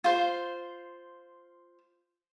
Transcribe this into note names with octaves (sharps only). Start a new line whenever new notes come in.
F4 C5